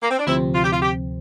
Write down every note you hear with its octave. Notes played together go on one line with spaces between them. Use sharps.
A#3
C4
D4
D2 C3 F3 C4 E4
F4
G4
F4
G4